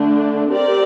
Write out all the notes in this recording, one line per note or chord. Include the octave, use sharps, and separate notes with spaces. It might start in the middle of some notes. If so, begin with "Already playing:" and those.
Already playing: D3 A3 D4
C4 G4 A#4 D5